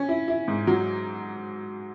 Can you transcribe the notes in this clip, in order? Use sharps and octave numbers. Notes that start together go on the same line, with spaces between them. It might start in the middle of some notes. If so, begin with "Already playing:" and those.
Already playing: C#4
E4
E4
G#2
F#3